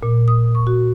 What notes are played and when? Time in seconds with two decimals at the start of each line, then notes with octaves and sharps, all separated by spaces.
0.03 A#2
0.28 D#6
0.55 C#6
0.67 F#4